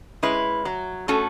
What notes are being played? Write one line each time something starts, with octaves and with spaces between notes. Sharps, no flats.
G#3 C#4 E4 B4
F#3
A3 C#4 F#4 A4